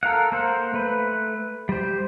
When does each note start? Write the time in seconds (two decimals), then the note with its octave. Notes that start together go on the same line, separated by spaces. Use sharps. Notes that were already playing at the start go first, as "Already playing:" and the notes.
0.03 A4 A#4 F5 F#5
0.32 A#3 C5 F#5
0.74 A3 B4
1.69 G3 C5